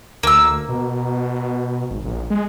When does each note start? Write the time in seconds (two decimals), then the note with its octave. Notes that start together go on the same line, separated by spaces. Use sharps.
0.23 D2 A#3 E6
0.69 B2
1.91 G#1
2.05 A#1
2.30 G#3